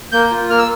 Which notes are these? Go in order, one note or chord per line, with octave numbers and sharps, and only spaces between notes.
A#3 G6
F4
A#3 F6
E6